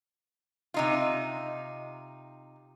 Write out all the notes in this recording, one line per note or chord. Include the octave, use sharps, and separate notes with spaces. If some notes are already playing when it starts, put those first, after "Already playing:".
C3 D#4 F4